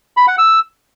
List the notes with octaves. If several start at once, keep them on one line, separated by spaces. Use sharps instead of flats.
B5
F#5
E6